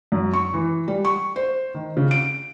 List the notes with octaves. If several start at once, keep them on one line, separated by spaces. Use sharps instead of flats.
F#2
C#6
E3
G3
C#6
C5
D#3
C#3
D7